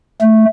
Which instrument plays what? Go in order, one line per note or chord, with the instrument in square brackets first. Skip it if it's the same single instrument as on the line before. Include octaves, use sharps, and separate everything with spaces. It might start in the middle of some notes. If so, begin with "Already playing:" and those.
[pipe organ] A3